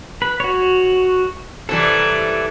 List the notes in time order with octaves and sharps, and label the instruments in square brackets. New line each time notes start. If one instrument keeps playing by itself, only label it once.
[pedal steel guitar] B4
F#4 C#5
[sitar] C3 E3 G3 [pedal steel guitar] A4